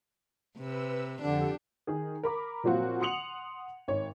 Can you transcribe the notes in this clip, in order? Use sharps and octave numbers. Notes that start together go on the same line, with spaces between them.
C3 B4 E6
F2 D3 D4 G4 A4
D#3 G#4
A#4 B5 D6
A#2 F3 F#3 C4 F4 F#4
F#5 C6 D#6 C#7 F7 F#7
G#1 C#5